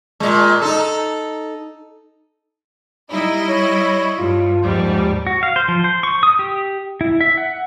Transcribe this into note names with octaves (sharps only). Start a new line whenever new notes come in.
A#2 G#3
D#4 A4
G3 D#4 E4 D#5
C#5
G2 F4
D#2 G#2 F3 G3
F#4
F5
C5
F3
C5
C#6
D#6
G4
E4
E5
F#5